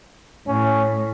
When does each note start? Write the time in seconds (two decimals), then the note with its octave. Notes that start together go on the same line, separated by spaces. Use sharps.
0.48 A2 C#4